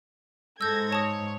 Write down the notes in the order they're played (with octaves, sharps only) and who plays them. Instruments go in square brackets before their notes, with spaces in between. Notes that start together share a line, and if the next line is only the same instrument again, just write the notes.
[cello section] G#2 [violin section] A4 G#6 A#6 [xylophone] E6 G6
[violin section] C#5 [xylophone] A5 D#6